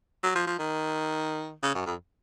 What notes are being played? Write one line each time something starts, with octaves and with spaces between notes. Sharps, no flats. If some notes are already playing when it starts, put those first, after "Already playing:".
F#3
F3
F3
D#3
C#3
F#2
F2